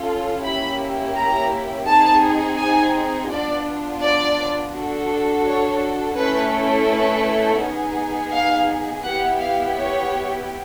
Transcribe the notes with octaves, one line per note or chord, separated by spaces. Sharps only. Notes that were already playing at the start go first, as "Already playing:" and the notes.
Already playing: C#4 F4 A4
A#3 C#4 E4 G4 B5
A#5
C4 D#4 G#4 A5
G#5
B3 D4 F4 D5
D5
D4 F#4 A4
C#5
A3 C#4 E4 A4 B4
B4
B3 D#4 G#4
F5
B3 E4 G4 F#5
F5
C#5